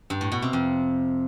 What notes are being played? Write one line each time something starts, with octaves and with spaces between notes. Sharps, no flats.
G2
A2
B2
C3
F2